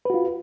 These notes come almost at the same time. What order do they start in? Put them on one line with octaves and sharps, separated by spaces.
B4 F#4 F4